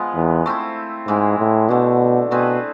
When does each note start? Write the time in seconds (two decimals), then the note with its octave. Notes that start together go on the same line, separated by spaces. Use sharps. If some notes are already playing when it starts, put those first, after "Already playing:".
Already playing: F3 G#3 B3 F4
0.15 E2
0.46 A3 C4 E4
1.07 G#2 E3 G#3 C4 E4
1.39 A2
1.69 B2 D3 A3 D4
2.31 B2 A3 C4 G#4 B4